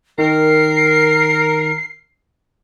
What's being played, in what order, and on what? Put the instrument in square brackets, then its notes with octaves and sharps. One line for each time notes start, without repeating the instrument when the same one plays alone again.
[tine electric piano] D#3 [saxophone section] A#4 [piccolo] C7